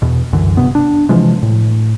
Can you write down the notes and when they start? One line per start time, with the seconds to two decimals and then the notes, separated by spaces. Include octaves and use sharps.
0.02 E2 B2
0.32 C2 F#2 D3 E3
0.57 F1 G2 C3 B3
0.75 D4
1.09 C3 E3 F3 G#3
1.43 A2